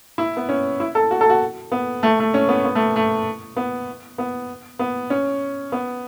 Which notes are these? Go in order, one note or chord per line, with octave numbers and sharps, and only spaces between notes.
E4
B3
C#4
E4
A4
F#4
A4
F#4
B3
A3
A3
C#4
B3
B3
A3
A3
B3
B3
B3
C#4
B3